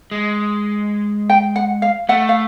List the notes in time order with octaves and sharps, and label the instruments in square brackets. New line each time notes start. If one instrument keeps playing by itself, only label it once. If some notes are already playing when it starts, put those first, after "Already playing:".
[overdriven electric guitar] G#3
[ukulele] G5
F#5
F5
[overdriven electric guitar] A3 [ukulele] F#5
[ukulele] F5